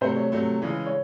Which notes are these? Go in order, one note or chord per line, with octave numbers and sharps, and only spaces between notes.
C3 F#3 A3 C5
C#5
C3 F#3 A3
C#3 E3 G#3
C#5